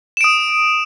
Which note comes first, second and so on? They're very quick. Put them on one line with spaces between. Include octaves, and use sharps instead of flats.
E7 D7 D#6